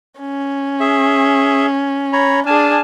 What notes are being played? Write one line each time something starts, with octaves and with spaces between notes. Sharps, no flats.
C#4
G#4 E5
C#5 A#5 B5
D4 G#4 G#5 A5 F6